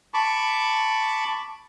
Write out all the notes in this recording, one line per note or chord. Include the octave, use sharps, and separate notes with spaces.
A5 B5 C#6 D6